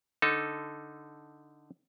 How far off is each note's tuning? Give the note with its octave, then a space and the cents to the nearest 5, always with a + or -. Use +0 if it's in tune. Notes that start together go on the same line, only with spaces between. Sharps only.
D3 +0 D#4 +0 A4 +0